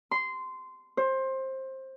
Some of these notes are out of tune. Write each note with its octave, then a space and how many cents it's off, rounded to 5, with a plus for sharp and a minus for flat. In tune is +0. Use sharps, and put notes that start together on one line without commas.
C6 -15
C5 +20